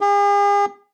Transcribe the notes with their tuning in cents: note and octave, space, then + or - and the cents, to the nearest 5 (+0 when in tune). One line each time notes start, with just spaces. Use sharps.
G#4 -45